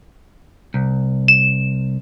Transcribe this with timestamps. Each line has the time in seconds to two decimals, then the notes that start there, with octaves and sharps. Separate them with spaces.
0.74 C2
1.28 E7